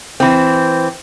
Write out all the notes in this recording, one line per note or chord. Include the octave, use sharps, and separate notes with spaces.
E3 C4